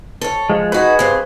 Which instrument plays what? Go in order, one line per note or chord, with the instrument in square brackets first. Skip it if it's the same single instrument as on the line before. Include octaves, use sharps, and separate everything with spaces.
[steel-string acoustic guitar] A4 C#5
[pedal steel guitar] F3 G#3
[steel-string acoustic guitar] D#4 F#4 [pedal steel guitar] G#4 B4
[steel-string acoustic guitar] G2 C4